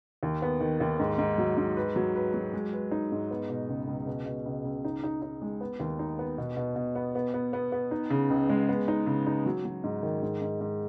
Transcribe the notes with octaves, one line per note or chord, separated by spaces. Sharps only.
D#2
B3
D#3
D#2
G#2
G#2
F#3
G#2
B4
F#3
B4
F#3
G#3
B4
D#4
G#2
B3
B2
C#2
C#2
B2
B2
C#2
C#2
D#4
D#4
D#4
G#3
B3
D#2
D#4
B3
B2
B2
B2
B3
B3
B3
B3
B3
D#4
C#3
C#2
G#3
B3
D#4
C#3
D#4
F#3
F#3
G#2
D#3
G#2
G#2
G#2